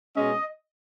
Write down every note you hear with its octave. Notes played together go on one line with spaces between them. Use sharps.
B2 G#3 C#4 D#5